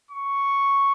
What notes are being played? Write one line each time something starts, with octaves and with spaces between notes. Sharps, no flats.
C#6